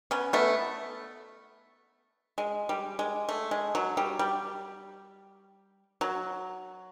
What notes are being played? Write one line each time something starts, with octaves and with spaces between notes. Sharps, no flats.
B3 C#4
A3 B3
G#3
G3
G#3
A3
G#3
F#3
G3
G3
F#3